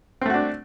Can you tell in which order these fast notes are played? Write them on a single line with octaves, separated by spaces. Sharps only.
C4 A3 F#4 D4